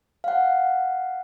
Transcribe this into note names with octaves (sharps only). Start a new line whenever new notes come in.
F5 F#5